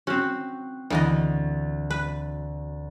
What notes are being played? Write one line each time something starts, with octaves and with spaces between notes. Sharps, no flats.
C4 C#4 F#4
D2 E3 B3 D#5
B4